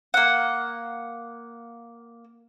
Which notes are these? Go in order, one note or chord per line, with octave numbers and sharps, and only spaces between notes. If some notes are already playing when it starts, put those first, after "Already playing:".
A#3 F#5